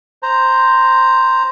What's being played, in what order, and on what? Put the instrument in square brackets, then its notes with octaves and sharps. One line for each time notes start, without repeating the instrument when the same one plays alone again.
[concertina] C5 A#5